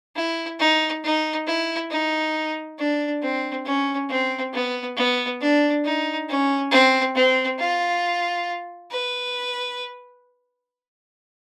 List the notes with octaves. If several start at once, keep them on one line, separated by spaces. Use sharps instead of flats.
E4
D#4
D#4
E4
D#4
D4
C4
C#4
C4
B3
B3
D4
D#4
C#4
C4
C4
F4
B4